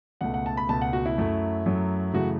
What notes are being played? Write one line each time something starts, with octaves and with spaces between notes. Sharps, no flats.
C#2 B2 A3 F#5
F#5
A5
B5
C#2 B2 A3 A5
F#5
F#4
E4
F#2 F#3 A3
F#2 F#3 A3
F#2 C#3 E3 A3 F#4